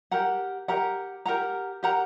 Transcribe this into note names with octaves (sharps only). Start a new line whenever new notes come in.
G4 A#4 F#5 A#5
G4 A#4 F#5 A#5
G4 A#4 F#5 A#5
G4 A#4 F#5 A#5